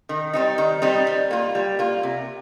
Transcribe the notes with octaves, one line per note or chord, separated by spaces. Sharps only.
D#3
G3 C4 D#4
D#3
G3 C4 D#4
G3
A#3 F4
G3
A#3 F4
C3